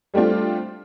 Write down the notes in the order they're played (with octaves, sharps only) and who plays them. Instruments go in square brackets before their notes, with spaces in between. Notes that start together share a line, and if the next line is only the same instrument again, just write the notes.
[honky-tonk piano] G3 A3 C4 D4 F4